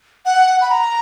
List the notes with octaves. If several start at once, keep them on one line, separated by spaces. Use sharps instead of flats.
F#5
B5
A#5